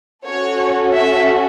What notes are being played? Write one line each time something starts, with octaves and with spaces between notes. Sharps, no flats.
C#4 F#4 A4 C#5
E5